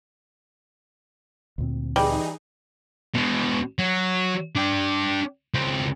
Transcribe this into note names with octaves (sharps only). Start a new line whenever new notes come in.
D2 A#2 C4
E3 G3 D#4 G#4
B2 G#3
F#3
D4 G5
C#2 C4